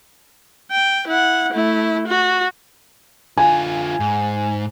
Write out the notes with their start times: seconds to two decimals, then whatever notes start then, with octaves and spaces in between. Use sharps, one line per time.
0.71 G5
1.07 E4 F#5
1.53 A3 E4
2.07 F#4
3.37 D3 F4 G#5
4.00 G#2